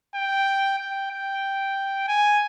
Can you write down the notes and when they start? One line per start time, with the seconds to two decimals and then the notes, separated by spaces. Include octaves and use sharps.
0.15 G5
0.79 G5
1.11 G5
2.08 G#5